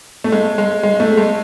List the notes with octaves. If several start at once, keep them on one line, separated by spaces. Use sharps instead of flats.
A3
G#3
G#3
G#3
A3
G#3